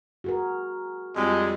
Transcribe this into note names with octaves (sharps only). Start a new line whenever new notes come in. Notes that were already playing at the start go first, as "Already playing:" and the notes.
F#4 G#4 A#4
F2 G3 G#3